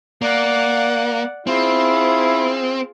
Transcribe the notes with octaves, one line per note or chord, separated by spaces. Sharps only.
A#3 D5 F#5
C4 E4 F4 G#4